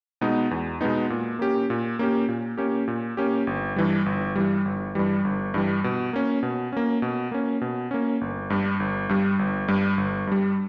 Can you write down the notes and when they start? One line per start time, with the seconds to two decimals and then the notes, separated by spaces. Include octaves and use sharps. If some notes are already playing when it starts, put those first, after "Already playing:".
0.21 B2 G#3 B3 D#4
0.51 E2
0.81 B2 G#3 B3 D#4
1.10 A#2
1.39 A#3 C#4 G4
1.70 A#2
1.99 A#3 C#4 G4
2.29 A#2
2.58 A#3 C#4 G4
2.88 A#2
3.17 A#3 C#4 G4
3.47 G1
3.76 G2 E3 G3
4.06 G1
4.35 G2 E3 G3
4.65 G1
4.95 G2 E3 G3
5.25 G1
5.54 G2 E3 G3
5.84 B2
6.13 A#3 C#4
6.43 B2
6.73 A#3 C#4
7.02 B2
7.32 A#3 C#4
7.61 B2
7.91 A#3 C#4
8.21 G1
8.50 G2 G3
8.80 G1
9.09 G2 G3
9.39 G1
9.68 G2 G3
9.98 G1
10.27 G2 G3